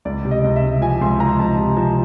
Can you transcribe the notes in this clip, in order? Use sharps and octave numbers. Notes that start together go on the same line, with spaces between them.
C#2 D5
C3
D#5
C#2
E5
C#2
F3 G#5
C#2 C6
F3 A#5
C#2 A5
C3
F3